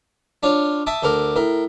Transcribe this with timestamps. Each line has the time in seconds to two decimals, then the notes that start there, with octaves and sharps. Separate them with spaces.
0.43 D4 F4 C#5
0.86 E5 A5 D6 D#6
1.03 D2 A4 A#4 D6
1.36 A2 A#4